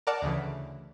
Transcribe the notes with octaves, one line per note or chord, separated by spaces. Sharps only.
A#4 D5 F#5 A5
D2 C#3 E3